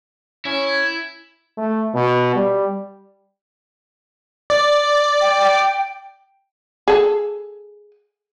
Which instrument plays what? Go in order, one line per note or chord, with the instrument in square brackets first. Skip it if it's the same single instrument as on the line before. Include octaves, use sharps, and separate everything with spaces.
[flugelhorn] C#4 [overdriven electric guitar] E4 [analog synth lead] G#6
[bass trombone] A3
B2
G3
[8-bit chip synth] D5
[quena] G5
G5
[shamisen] G#4 A4